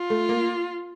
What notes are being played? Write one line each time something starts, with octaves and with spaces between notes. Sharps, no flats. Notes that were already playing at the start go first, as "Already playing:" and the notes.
Already playing: F4
A3
A#3